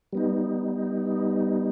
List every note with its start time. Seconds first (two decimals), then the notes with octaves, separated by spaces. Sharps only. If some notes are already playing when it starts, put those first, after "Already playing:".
0.13 G3 B3 D#4